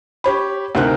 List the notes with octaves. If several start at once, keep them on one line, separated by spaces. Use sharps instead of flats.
G4 C#5 B5
D2 C3 C4 D#4 A#4 F#6